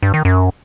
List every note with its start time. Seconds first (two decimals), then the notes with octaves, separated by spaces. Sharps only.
0.03 G2
0.14 D#3
0.25 F#2